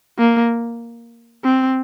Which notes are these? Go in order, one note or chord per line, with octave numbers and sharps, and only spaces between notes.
A#3
C4